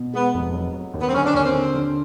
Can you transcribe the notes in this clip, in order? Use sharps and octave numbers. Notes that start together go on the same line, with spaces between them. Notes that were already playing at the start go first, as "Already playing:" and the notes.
Already playing: B2
G#3 B3
F1
F#3
F#3
D#2
B3
C4
D3 C#4
D4
D#2 C#4
C4
D3
D3